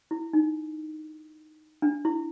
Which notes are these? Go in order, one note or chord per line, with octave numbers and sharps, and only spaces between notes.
E4
D#4
D4
E4